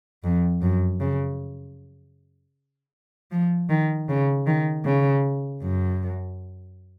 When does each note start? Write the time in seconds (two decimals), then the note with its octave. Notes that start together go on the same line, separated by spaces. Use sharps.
0.24 F2
0.62 F#2
1.00 C#3
3.31 F3
3.70 D#3
4.09 C#3
4.46 D#3
4.85 C#3
5.62 F#2